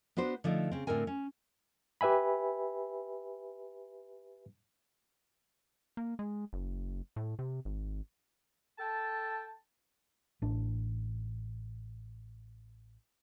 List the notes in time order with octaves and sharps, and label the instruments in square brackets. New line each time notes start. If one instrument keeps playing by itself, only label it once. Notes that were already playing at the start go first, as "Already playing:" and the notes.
[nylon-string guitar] B3 D4 F#4 C5
D3 F3 A3 D#4 D5
C#3 C4
A2 D3 C4 A#4 G#5
C#4
[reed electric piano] G4 B4 E5 G#5 B5
[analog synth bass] A#3
G#3
F#1
A2
C3
G#1
[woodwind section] A4 G5 A5
[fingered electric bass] A1 D4